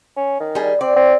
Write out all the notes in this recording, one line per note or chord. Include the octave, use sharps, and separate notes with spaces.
C#4
D#3
G3 G#4
C4 D5
C4